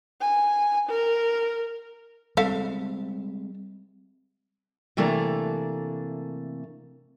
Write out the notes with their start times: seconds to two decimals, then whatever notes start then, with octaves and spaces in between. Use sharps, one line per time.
0.21 G#5
0.89 A#4
2.37 G3 G#3 C4 A4 E5 F5
4.97 C3 E3 A3 A#3 D4 A#5